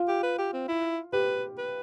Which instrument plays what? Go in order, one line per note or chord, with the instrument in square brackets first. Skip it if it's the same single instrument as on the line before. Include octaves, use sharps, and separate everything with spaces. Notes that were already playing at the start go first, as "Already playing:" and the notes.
Already playing: [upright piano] F4
[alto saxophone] G4
B4
G4
C4
E4
[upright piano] G4 [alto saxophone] B4
[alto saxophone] B4